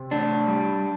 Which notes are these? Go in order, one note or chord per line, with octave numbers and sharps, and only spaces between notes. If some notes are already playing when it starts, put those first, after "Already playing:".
Already playing: C3
A2 D4
G3